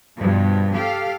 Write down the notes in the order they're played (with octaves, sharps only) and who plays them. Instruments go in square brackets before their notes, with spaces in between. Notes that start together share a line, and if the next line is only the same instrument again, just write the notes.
[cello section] G2 B2 F3
G4 A4 F5